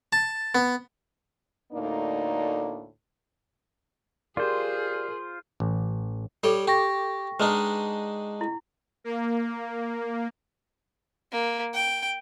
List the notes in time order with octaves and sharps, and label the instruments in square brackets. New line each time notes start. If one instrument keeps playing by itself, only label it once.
[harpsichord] A5
B3
[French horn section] D2 A2 A#3 D4 D#4 D5
[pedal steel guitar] F4 C5 [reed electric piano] G4 D5 [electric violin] G#4 [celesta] A#4
[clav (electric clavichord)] A1
[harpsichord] G3 C#5 G5 [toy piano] A4 D6
[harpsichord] G4 [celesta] G5 C#6 A#6
[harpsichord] G#3 D4 D#4 [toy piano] B4
[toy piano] E4
[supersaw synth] A#3
[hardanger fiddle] A#3
G5